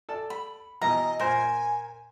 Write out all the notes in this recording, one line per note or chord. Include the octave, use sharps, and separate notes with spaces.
A4 D5 A5
B5
B2 E3 D#5 A#5
A#2 A#4 C5 G#5